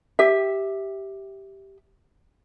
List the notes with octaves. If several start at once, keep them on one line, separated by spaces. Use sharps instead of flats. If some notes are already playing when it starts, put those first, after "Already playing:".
G4 E5